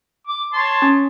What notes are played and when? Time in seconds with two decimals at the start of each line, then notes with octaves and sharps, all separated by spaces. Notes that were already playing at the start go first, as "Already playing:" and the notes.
0.27 D6
0.53 C#5 A5 C6
0.82 C#4